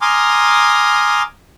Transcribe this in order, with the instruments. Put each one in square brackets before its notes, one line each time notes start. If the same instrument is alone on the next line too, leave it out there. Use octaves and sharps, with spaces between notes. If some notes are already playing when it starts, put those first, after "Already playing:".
[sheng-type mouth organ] G#5 A#5 C6 D6 D#6 F6